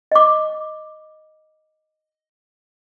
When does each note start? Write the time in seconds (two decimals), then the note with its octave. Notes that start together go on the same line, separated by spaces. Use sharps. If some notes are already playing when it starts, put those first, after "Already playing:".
0.12 D#5 D6